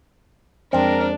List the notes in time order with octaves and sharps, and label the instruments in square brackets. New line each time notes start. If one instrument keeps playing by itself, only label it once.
[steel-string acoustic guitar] F2 G#3 [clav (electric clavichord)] C4 [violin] D4 [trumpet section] A#4